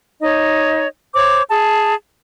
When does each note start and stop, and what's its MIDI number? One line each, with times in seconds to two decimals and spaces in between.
0.20 0.86 63
0.20 0.86 73
0.20 0.86 75
1.14 1.42 72
1.14 1.42 73
1.14 1.42 86
1.49 1.94 68
1.49 1.94 81